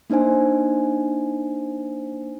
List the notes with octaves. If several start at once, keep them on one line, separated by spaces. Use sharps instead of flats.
A#3 D4 D#4 C5 G#5